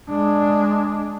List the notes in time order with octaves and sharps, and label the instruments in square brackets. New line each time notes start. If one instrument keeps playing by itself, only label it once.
[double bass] G#3 D4